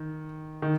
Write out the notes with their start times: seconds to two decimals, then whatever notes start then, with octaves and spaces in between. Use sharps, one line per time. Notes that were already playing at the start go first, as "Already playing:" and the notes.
Already playing: D#3
0.62 D#3